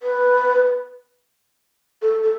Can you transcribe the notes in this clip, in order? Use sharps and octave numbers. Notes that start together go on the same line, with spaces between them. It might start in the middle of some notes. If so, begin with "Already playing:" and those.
B4
A4
A4